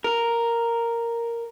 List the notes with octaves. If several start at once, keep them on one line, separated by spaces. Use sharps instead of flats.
A#4